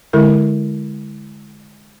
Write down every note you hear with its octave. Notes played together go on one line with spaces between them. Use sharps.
D3 G#3 E4 A#4